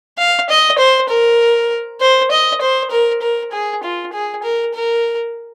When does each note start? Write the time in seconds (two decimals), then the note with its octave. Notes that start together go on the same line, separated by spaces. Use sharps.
0.18 F5
0.49 D#5
0.79 C5
1.09 A#4
2.01 C5
2.31 D#5
2.62 C5
2.91 A#4
3.22 A#4
3.52 G#4
3.84 F4
4.13 G#4
4.43 A#4
4.74 A#4